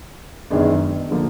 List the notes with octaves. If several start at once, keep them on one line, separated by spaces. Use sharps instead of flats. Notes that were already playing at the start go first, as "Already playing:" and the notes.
F#2 D#3 G#3 B3 D4
D3 F3 A#3